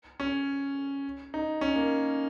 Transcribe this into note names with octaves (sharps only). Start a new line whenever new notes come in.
C#4
D#4
C#4
A#3